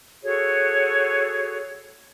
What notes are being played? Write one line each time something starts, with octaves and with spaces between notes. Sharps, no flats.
F#4 G#4 A4 C#5